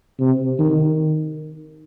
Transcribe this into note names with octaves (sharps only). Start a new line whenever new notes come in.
C3
D#3